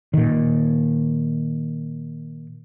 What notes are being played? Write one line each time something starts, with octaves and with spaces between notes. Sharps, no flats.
A#2 D#3